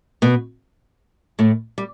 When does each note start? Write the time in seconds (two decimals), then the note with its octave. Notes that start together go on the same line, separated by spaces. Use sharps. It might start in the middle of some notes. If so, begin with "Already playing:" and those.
0.22 B2 B3
1.39 A2 A3
1.78 G3